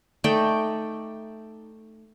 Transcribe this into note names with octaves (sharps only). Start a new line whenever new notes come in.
A3 D#4 D5 G5